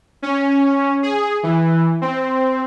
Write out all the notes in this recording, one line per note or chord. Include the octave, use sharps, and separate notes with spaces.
C#4
G#4
E3
C4